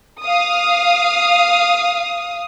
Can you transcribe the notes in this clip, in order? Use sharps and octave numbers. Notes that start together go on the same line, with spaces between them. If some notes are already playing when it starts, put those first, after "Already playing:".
F5 D#6